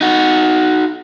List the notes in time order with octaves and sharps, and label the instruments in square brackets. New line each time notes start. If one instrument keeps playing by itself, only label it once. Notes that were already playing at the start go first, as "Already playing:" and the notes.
[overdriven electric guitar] D#4 F#4